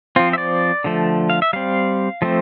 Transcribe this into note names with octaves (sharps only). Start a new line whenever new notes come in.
F3 C4 F4
E5
D5
D3 F3 A3
F5
E5
G3 C4 F5
F3 A3 C4